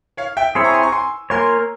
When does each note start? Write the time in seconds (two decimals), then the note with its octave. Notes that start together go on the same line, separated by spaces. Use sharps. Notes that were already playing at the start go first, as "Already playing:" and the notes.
0.17 C#5 F5
0.37 E5 G5
0.55 C4 E4 G#4 C#5 C6 E6
0.64 A#5 C#6
0.74 G#5 C6
0.83 A#5 C#6
0.92 G#5 C6
1.30 A#3 F4 A#4 C#5 G#5 C6